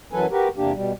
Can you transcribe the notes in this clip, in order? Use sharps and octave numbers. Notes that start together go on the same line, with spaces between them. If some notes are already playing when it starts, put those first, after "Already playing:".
F#2 E3 F#3 A4 B4 G#5
F#4 G4 A#4 B4
E2 C3 A#3 D4 G4
B2 G3